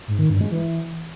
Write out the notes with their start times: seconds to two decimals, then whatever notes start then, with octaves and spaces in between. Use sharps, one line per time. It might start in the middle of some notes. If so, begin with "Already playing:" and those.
0.08 G#2
0.19 D#3
0.30 G2
0.41 G#3
0.52 E3